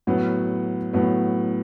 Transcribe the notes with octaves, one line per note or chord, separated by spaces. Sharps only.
A2 F#3 B3
A2 F#3 B3